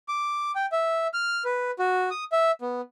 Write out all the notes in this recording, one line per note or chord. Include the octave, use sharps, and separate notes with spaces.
D6
G5
E5
F6
B4
F#4
D#6
E5
B3